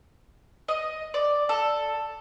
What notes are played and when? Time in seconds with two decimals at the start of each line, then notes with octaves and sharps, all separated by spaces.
0.68 D#5
1.14 D5
1.49 A4